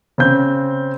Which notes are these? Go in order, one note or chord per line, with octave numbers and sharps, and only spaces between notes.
C#3 C4 G6